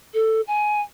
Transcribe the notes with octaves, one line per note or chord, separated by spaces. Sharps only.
A4
G#5